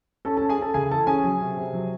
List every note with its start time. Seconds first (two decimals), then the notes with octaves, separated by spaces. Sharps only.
0.25 C#4 A4 A5
0.37 A4 A5
0.42 C#4
0.49 G#4 G#5
0.58 C#4 A4 A5
0.74 C#3 G#4 G#5
0.90 E3 A4 A5
1.07 C#4 G#4 G#5
1.24 F#3
1.41 C3
1.56 C3
1.73 F#3